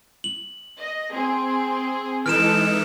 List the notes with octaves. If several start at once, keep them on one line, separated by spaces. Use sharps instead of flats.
F#7
D#5
C4 G#4
E3 G#3 D#4 A4 F6 D7 E7